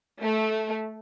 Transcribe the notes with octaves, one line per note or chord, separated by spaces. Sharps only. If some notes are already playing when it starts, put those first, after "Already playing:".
A3